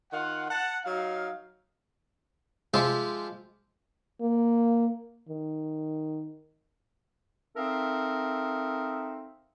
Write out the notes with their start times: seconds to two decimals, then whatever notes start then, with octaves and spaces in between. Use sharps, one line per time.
0.12 D#3 F4 F5 F#5
0.50 F#5 A5
0.84 F#3 D#4 F5
2.74 F3 G#3 F4 G4 E5
4.21 A#3
5.29 D#3
7.55 C4 D#4 A4 A#4 E5 F5